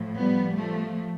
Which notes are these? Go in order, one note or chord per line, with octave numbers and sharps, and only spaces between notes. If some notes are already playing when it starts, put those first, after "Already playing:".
Already playing: A2 F3
G3 B3
F3 A3